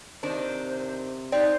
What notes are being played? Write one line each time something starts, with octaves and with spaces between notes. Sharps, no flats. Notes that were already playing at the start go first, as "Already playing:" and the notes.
C3 D#3 D4 C5
C4 D#4 D5